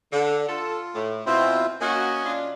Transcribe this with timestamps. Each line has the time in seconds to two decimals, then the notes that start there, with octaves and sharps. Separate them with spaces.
0.12 D3
0.49 F4 A4
0.95 A2
1.26 B2 C4 E4 F4 C5
1.81 A#3 C#4 F#4 D#5 G#5
2.25 C#3 D4 F4